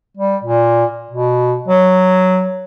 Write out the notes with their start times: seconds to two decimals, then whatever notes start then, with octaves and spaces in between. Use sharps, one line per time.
0.17 G3
0.44 A#2
1.11 B2
1.68 F#3